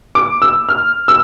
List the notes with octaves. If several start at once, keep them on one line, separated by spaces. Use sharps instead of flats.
D6
E6
F6
E6